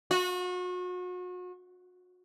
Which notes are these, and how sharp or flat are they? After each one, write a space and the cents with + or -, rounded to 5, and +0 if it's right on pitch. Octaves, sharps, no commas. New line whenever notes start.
F#4 -35